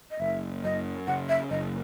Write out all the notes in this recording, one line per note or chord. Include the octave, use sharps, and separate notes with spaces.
D#5
F#1 E5
F#2 D#5
C#3 F#5
E5
F#1 D#5